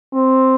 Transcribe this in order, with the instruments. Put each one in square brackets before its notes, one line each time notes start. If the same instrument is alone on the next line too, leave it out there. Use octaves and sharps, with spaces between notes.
[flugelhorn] C4